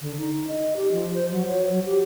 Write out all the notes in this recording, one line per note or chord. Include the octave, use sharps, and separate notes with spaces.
D3
D#4
D#5
G4
F3
C5
F#3
C#5
F#3
G4